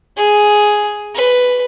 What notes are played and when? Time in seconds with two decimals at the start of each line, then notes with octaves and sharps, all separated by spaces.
0.17 G#4
1.15 B4